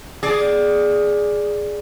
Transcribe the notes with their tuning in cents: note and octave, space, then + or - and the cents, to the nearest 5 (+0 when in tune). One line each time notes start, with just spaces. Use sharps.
G#4 +0 D5 +0